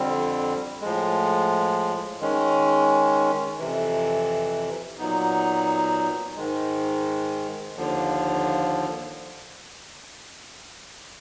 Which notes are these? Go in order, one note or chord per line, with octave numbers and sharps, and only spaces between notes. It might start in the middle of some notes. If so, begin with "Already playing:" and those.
Already playing: F2 D3 G3 C4
A2 F3 G#3
D#3 G#3 C#4
F2 C3 E3
A#2 F#3 B3 D#4
G#2 D#3 G#3
D#2 D3 F3